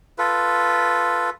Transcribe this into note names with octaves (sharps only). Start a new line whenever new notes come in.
F4 A4 B4